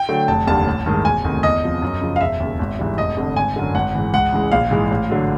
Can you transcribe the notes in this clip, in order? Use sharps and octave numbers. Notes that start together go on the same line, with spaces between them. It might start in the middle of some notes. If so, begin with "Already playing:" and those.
Already playing: G5
D3 F#3 A3
F1 A5
D#2 D3 G3 A5
A1
G2 D#3 G#3
E1 G#5
D2 C3 D#3
E2 D#5
C3 F3
F#2
C#3 F3
F5
E1 E5
D#2 C#3
G#1
G#2 E3 G3
F1 D#5
F2 D3
G#1 G#5
F#2 D3
G#1 F#5
G#2 E3
C#2 F#5
C#3 E3 G#3
A#1 F5
G#2 E3 G#3
A1
D3 F#3